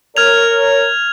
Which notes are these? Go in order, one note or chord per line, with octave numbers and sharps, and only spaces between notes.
A#4 C#5 F6 G#6 F7